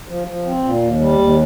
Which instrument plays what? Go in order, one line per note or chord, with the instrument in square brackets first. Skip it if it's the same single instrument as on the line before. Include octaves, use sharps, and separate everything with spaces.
[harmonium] F3
F3
C4
A#2
D#2
G3
D#2